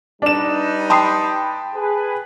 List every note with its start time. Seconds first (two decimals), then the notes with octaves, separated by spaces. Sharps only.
0.22 G3 D4 D#4 B4 E7
0.90 G5 A5 B5 C6 D#6 C7
1.75 G#4 B4